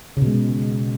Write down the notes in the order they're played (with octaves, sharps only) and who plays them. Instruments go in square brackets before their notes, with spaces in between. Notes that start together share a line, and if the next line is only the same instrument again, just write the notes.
[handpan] C#3
B2
G#3